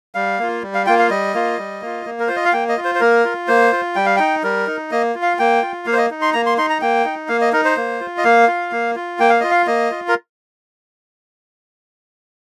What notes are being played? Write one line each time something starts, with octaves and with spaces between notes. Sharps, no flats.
G3 F5
A#3 F4
G3
F5
A#3 F4 G5
F5
G3 D#5
A#3 F4
G3
A#3 F4
A#3
A#4
F4 C5
D#5
F5
A#3 G5
D#5
F4
C5
C5
A#3 A#4
F4
A#3 C5
F4
G3 G5
F5
D#4 G5
G3 A#4
D#4
A#3 D#5
F4
F5
A#3 G5
F4
A#3 F5
C5
D#5
D#4
C6
A#3 A#5
C6
D#4 C6
A#5
A#3 G5
D#4
A#3 F5
D#5
D#4 A#4
C5
A#3
F4
D#5
A#3 F5
F4
A#3
F4
A#3 G5
F5
F4 D#5
F5
A#3 D#5
F4
A#4